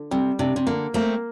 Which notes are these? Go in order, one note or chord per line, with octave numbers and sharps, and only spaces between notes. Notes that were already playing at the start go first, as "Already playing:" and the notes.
Already playing: D3
C3 G3
C3 D4
C3
D3 A#3
A3 A#3 C4